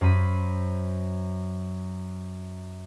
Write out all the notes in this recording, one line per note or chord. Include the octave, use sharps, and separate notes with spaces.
F#2 C5 B5 D#7